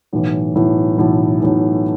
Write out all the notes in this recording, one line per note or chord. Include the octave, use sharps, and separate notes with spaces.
B1 A2 E3
B1 A2 E3
B1 A2 E3
B1 A2 E3